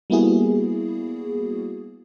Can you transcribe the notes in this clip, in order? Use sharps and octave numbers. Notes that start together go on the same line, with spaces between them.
G3 A#3 B3 E4 F#4 G#4